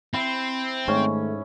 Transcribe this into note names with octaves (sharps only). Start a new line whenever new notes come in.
C4 E4
G#2 D#3 A3 C#4